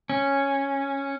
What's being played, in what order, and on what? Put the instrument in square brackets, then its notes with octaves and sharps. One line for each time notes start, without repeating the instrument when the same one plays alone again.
[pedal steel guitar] C#4